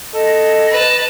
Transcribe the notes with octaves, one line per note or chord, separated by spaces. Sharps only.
A4 D#5
B4 A5